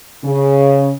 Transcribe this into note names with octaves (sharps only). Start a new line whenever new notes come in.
C#3